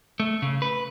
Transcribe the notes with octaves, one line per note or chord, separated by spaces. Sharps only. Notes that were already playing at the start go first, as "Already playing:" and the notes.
A3
C#3
B4